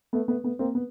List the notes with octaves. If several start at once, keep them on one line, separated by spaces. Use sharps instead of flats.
A3 B3
A3 B3
A3 B3
A#3 C4
B3